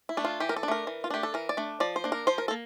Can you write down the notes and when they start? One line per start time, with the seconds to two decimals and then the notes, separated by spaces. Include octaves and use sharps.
0.09 E4
0.17 A3 D4
0.25 F4
0.40 E3 G4
0.49 A#4
0.56 A4
0.63 D4
0.68 A3 A#4
0.87 E3
1.04 F4
1.10 A3 D4 G4
1.23 A4
1.34 E3 A#4
1.49 D5
1.57 A3 D4
1.80 F3 D5
1.96 C5
2.04 A#3 D4
2.12 A#4
2.27 F3 C5
2.38 A#4
2.48 A4
2.51 A#3